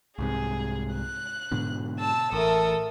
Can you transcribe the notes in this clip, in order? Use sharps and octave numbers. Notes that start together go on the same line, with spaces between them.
C2 G#2 C3 G#4
F#6
G#2 B2 D3
A5 E6
A1 A4 A#4 E5 D#6